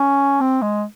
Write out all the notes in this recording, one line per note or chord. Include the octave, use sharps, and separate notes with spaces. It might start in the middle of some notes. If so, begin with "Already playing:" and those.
Already playing: C#4
C4
G#3